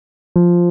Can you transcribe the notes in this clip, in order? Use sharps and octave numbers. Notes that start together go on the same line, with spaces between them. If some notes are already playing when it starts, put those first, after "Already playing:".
F3